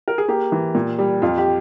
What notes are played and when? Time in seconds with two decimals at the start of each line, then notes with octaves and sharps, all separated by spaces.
0.08 A#4
0.18 G#4
0.28 A#3 G4
0.52 E3
0.75 A#2
0.99 G3
1.22 F2 F4
1.38 G4